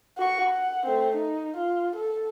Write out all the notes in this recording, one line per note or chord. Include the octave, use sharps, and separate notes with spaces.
F#4 C#6
F#5
A3 C4
D#4
F4
A4